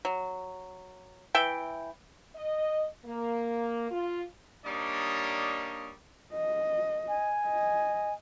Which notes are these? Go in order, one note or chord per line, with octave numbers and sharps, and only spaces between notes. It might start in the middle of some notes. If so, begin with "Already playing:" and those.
F#3
E3 E5 G5
D#5
A#3
F4
G3 A#3 D4 D#4 C#5 D#5
D#5
G#5
D#5